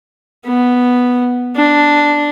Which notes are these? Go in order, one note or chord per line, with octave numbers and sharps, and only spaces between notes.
B3
D4